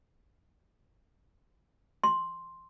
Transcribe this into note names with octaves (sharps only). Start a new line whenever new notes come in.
C6